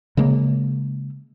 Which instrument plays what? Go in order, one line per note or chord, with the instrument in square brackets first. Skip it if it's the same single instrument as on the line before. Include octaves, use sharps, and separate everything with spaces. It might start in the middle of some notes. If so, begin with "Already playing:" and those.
[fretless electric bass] C#3 G#3 A#3